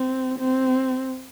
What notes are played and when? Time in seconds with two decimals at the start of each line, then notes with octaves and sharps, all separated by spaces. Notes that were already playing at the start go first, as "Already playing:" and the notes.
Already playing: C4
0.39 C4